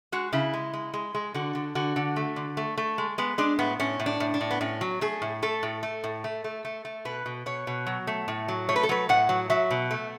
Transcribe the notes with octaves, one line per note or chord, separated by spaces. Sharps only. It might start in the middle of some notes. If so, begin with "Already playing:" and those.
G#3 F#4
C#3 E4
G#3
G#3
G#3
G#3
D3 F#4
D3
D3 F#4
D3
A3
D3
A3
A3
G#3
G#3 B3
G#3 D4
A2 B3
A2 C#4
A2
D4
A2
D4
A2
B3
A2 C#4
F#3
A3 G#4
A2
A3 A4
A2
A3
A2
A3
A3
A3
A3
B2 B4
B2
B2 C#5
B2
F#3
A3
A2
F#3
A3 C#5
B4
A4
F#3 B4
A2 F#5
F#3
F#3 E5
B2
A3